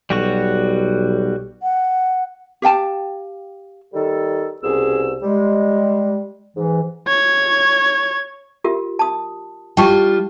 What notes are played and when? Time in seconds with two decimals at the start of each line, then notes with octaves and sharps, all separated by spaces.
0.10 B1 G3 F#4 C#6
1.63 F#5
2.62 G4 F5 G5 A5
3.93 D#3 G3 A4
4.62 C2 B2 C#4 G#4 E6
5.22 G3 G#3
6.56 G#2 E3
7.08 C#5 G#6
8.64 F4 G4 A#4
8.99 A5 D#6
9.77 G3 F4 G5 A5 C#6